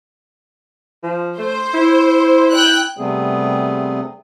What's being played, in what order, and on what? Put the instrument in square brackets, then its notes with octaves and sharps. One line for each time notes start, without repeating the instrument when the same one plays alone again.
[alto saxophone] F3
[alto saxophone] A3 [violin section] C5
[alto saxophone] E4
[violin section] G5 F#6
[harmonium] C3 G3 A3 B3 C4 G#4